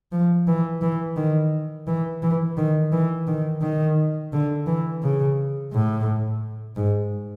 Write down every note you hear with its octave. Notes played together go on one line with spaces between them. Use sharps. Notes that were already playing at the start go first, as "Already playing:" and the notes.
F3
E3
E3
D#3
E3
E3
D#3
E3
D#3
D#3
D3
E3
C#3
A2
G#2